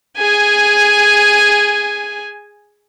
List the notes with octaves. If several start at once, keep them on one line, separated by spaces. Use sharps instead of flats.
G#4 G#5